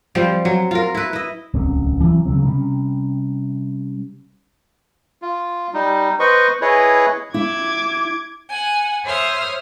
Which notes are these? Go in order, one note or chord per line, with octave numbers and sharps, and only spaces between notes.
F3 G3 C4
F#3
F4 A#4
E4 B4
E4 D#5
D1 C2 C4 C#4
E3 F#3 C4
C#3 F3 F#3 C4
C3 G3 C#4
F4
G3 D#4
B4 C5 D#5 C#6
E4 G#4 B4 C#5 D#5
E4 D6 G#6
F#5 G#5
C5 C#5 E5 D#6 F6